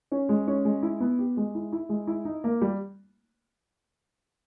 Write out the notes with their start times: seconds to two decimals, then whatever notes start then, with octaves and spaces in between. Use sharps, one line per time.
0.12 C#4
0.29 G#3
0.47 C#4
0.65 G#3
0.83 E4
1.00 B3
1.19 G4
1.37 G#3
1.55 E4
1.73 E4
1.89 G#3
2.07 E4
2.25 D#4
2.44 A#3
2.61 G3